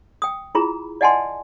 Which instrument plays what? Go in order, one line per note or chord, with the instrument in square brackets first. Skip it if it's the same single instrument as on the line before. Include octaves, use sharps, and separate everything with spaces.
[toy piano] G5 D#6
E4 F4 G#4 A#5 B5
D5 D#5 F#5 G#5 A5 C6